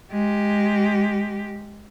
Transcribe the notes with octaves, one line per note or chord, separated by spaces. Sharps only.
G#3 G4